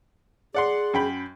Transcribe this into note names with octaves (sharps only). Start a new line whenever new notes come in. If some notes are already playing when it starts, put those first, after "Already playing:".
G#4 D5 F#5 C6
F#2 G5 B5